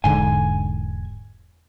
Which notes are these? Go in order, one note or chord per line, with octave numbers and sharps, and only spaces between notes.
E1 G#2 D3 G#5